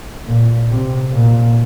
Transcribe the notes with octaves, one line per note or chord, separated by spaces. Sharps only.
A#2
C3
A#2